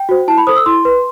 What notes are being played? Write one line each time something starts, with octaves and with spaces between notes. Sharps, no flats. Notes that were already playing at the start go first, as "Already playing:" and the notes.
Already playing: G5
F#4 C5
E4 A5
B5
A4 C5 D#6
E6
E4 C6
B4